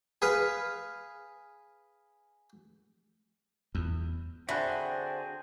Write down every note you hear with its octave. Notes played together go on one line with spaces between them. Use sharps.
G#4 B4 F5
E2
D3 C4 F#4 G#4 C5 E5 B5 F#6